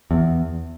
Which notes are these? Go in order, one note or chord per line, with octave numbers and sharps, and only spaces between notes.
E2